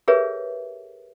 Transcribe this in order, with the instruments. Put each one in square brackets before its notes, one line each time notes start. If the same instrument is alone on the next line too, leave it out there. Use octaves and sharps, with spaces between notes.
[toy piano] G4 G#4 A#4 B4 C#5 E5